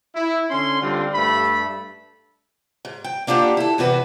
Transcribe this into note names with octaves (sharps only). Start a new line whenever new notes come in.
E4
D3 C#4 C6
D3 G3 C4 F4
G2 A3 A4 B5
G#2
G5
A#3 D4 F4 G4 F#5
E4 A4
E2 C3 F#4 B4